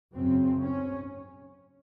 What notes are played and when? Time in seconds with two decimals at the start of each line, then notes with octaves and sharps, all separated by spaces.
0.15 F#2 C#3 C4
0.61 C#4